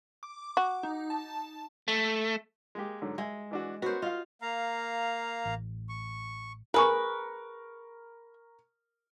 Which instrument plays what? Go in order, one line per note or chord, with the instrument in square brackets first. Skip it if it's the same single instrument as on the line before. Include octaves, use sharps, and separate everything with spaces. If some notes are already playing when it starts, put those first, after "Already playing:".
[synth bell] D6
[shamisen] F#4
[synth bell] D#4
A5
[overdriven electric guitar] A3
[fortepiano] G#3 A#3 G4
G#2 D3 F#3
[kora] G#3 [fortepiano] E5
[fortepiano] E3 D4 F#4
[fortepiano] B3 C#4 A#4 [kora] F#4 C5
[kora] F4 [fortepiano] D#5 F5
[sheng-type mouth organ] A#3 F5 A#5
[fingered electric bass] A1
[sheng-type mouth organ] C#6
[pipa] G#4 B4 [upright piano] A#4 C#6